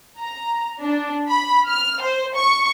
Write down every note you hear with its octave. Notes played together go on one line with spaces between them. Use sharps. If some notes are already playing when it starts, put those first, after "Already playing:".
A#5
D4
B5
F6
C5
C#6